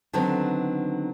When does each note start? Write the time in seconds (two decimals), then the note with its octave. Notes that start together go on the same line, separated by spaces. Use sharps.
0.13 D3 D#3 F#3 B3 C4 D#4